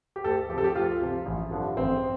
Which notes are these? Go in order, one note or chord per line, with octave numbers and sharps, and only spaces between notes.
G4
D2 A4
C3 F3 G4 A4
G4
D2 F4
C3 F3
A1
G2 D3 F3
A1 C4